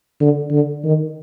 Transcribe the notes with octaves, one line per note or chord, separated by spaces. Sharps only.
D3
D3
D#3